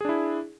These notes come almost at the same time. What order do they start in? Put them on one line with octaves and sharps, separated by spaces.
G#4 D4 E4